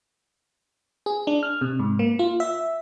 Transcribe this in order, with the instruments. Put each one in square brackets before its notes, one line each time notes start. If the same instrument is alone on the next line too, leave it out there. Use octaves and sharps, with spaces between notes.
[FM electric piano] G#4
D4
F6
C3
G#2
A#3
F4
E5